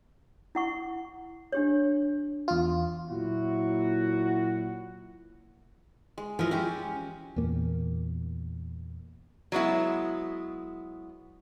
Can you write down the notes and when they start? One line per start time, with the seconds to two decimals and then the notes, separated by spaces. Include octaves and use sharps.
0.55 E4 F#5 C#6
1.52 D4 G4 C#5
2.48 E2 F4
3.10 A#2 F#3 E4 F#4
6.18 G#3
6.39 F3 E4 A#4
6.51 G#3 C#4 F4 G4
7.36 E2 A#2 A#3
9.52 F#3 G#3 B3 E4